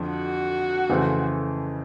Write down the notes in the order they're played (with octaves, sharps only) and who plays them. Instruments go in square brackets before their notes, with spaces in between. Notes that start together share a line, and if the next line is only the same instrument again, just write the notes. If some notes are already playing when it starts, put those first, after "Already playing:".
Already playing: [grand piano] F2 D3 F3
[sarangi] F#4
[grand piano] F2 C#3 E3 A3 C4